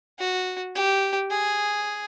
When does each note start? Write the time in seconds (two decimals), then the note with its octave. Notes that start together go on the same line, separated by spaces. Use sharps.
0.19 F#4
0.76 G4
1.31 G#4